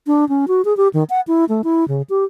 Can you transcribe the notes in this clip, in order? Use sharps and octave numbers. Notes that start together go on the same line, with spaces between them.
D4
C#4
F#4
G#4
G4
D#3
F#5
E4
A3
E4
C#3
G4